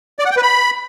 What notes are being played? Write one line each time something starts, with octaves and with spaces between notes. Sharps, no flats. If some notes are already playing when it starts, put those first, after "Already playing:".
D5
F#5
G5
B4
B5